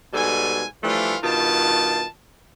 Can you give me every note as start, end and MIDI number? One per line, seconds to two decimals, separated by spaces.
0.14 0.64 44
0.14 0.64 47
0.14 0.64 55
0.14 0.64 69
0.14 0.64 80
0.83 1.15 52
0.83 1.15 53
0.83 1.15 55
0.83 1.15 57
0.83 1.15 62
0.83 1.15 65
1.23 2.05 43
1.23 2.05 47
1.23 2.05 51
1.23 2.05 65
1.23 2.05 81